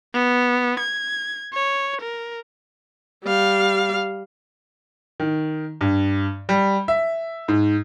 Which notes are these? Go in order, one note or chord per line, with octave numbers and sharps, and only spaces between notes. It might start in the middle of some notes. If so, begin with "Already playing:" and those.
B3
G#6
C#5
A#4
G3 F5
D#3
G2
G3
E5
G#2